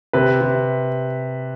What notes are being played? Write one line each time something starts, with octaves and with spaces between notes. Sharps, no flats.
C3 B4
C3